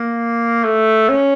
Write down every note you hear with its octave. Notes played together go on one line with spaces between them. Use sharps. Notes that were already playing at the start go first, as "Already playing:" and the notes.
Already playing: A#3
A3
C#4